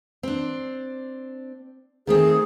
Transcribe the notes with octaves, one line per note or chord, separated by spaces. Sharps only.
C4 D4
D#3 A3 C4 G#4